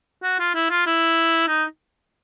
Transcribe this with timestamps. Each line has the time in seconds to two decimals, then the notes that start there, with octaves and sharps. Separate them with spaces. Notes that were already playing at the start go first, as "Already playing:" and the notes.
0.23 F#4
0.39 F4
0.55 E4
0.70 F4
0.86 E4
1.48 D#4